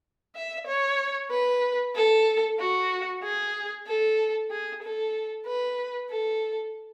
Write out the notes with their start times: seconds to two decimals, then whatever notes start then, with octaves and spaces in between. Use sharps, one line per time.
0.35 E5
0.67 C#5
1.30 B4
1.95 A4
2.59 F#4
3.23 G#4
3.87 A4
4.50 G#4
4.82 A4
5.46 B4
6.10 A4